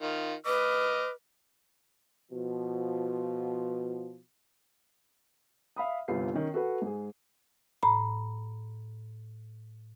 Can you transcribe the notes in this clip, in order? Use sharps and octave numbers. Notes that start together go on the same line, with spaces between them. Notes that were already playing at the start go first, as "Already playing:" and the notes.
D#3 F4
B4 D#5 D6 F6
B2 F3
E5 F5 B5 D#6
G1 C2 F4 B4 C7
D#3 C#4
F#4 A4 B4 F#5
G#2 G#4
A2 A#5 B5